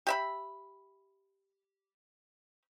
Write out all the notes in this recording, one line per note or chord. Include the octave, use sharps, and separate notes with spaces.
G4 E5 B5